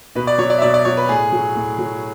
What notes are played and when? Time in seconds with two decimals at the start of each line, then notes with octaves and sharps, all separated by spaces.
0.15 B2 B4
0.27 D5
0.38 F#3 C#5
0.50 D5
0.58 E5
0.62 B2 D5
0.74 D5
0.85 F#3 C#5
0.97 B4
1.09 A2 G#4
1.32 F#3
1.55 A2
1.79 F#3